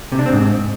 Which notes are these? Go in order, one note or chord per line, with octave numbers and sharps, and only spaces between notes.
C3
D4
C4
G#2